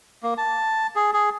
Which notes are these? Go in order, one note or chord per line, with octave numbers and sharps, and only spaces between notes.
A#3
A5
G#4
G#4